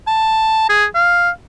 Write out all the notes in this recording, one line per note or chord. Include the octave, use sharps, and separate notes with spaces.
A5
G#4
F5